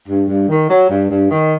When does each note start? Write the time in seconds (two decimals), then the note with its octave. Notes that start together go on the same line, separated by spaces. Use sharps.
0.08 G2
0.28 G2
0.48 D#3
0.70 F#3
0.90 G2
1.10 G2
1.31 D#3